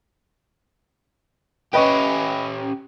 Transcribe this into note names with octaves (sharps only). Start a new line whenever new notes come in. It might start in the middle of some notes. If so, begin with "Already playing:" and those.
C#4 G4 B4 D#5 C#6